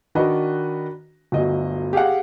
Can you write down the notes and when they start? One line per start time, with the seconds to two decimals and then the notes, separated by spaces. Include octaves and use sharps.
0.15 D#3 D4 F#4 B4 D#5
1.32 G1 D2 F#3 D#5
1.93 G4 G#4 F5 F#5